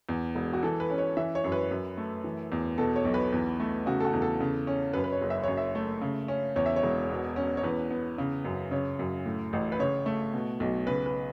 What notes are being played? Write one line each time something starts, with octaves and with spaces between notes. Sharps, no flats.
E2
E1
F#4
E3 A4
B4
C#4
C#5
E3 E5
C#5
F#2
B4
F#2
A3
E3
E2
B2 A4
C#5
B1
B4
E2
A3
C#3 F#4
A4
F#4
E2
A4
C#3
C#4
F#2 B4
B4
C#5
F#1
E5
F#2 C#5
E5
A3
C#3
C#4
E2 C#5
E5
C#5
E1
B2
C#4
C#5
E2 B4
B3
C#3
F#2
C#3 C#5
F#2
A2
A1
B4
C#3 C#5
A3
B2
B1
C#3 B4
B4